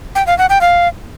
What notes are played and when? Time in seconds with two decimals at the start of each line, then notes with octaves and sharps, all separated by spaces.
0.15 G5
0.27 F5
0.38 F#5
0.50 G5
0.61 F5